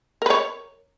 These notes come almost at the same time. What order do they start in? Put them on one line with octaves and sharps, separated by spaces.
A#4 B4 C#5